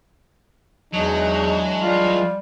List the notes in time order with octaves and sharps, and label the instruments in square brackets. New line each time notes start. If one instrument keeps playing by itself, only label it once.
[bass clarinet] E2 [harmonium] E3 G#3 D4 [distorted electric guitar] F#3 [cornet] D#4
[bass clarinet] G3 [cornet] F4